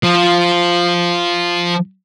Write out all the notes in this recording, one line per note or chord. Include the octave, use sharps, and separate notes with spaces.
F3